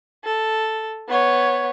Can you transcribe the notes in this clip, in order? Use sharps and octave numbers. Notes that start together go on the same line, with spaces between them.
A4
B3 C#5